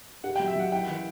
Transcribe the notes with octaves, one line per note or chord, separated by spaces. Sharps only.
G4 F#5
G5
F#3
E5
F#3 F#5
E4 G5
E3